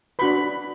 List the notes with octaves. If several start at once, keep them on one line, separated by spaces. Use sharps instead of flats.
D4 F#4 B4 B5